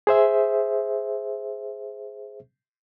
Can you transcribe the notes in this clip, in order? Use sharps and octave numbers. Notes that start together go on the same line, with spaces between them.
G#4 C5 E5